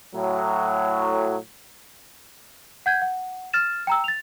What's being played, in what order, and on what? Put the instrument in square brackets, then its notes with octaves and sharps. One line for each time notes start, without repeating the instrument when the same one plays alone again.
[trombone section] A2 F#3
[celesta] F#5 G6 G#6
F#5
F6 A6 E7
G5 A#5 E6
A6 F7